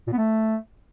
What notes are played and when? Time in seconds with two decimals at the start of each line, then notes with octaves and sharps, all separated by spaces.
0.07 A#2
0.12 B3
0.18 A3